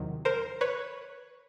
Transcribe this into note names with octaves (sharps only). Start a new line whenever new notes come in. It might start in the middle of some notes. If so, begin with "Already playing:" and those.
Already playing: E2 C3 D#3 F#3
A#4 C5
B4 C#5